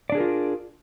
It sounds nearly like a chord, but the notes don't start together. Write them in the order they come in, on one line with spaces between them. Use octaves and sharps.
D5 D4 G#4 A#4 F4